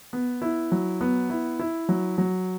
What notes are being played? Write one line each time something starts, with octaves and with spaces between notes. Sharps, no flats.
B3
E4
F#3
B3
E4
E4
F#3
F#3